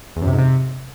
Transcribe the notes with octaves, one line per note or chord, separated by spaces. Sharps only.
E2
F#2
C3
G#2
C3